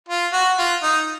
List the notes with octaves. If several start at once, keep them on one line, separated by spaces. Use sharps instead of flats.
F4
F#4
F4
D#4